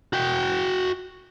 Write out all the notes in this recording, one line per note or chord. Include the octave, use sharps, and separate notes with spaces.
F#4 G5